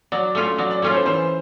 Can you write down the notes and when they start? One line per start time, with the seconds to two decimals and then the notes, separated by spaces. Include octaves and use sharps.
0.12 F#3 D5
0.35 A3 C#4 F4
0.58 F#3 D5
0.71 D5
0.82 A3 C#4 F4 C#5
0.94 C5
1.06 E3 C5